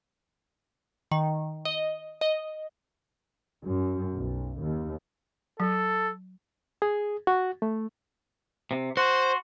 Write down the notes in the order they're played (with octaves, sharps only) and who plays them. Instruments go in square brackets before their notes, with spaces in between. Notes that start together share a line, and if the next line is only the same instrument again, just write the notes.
[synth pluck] D#3
D#5
D#5
[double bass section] F#2
B1
D#2
[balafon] F#3 [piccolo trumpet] A4
[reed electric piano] G#4
F#4
A3
[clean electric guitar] C3
[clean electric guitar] F#4 [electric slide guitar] C5 [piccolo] C6